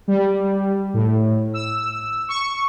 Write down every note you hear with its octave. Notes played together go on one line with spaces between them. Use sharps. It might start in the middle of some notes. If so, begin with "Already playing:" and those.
G3
A2
E6
C#6